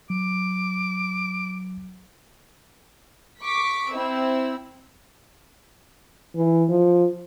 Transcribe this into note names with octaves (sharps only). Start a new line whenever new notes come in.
F#3 D6
C#6 D6 B6
C4 E4 E6
E3
F3